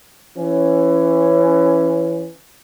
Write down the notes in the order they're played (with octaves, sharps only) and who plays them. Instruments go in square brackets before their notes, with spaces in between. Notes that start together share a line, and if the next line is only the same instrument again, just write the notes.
[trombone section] E3 C#4